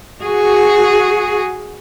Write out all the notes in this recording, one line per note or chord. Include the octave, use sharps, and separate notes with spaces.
F#4 G#4